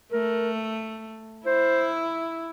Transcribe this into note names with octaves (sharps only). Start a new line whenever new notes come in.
A3 A#4
E4 C5